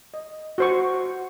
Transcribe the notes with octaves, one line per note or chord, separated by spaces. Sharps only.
D#5
F#4 C5 C#6